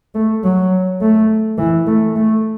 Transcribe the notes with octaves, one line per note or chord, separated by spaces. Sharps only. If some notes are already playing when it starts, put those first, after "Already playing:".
A3
F#3
A3
E3
A3
A3